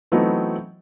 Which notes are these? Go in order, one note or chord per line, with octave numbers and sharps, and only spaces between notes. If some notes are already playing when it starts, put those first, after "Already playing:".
E3 F#3 A3 B3 C4 D#4